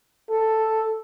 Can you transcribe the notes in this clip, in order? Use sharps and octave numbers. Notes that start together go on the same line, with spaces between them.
A4